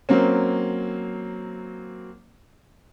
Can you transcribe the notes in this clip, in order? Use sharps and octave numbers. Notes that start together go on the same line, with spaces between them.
F#3 A#3 C4 C#4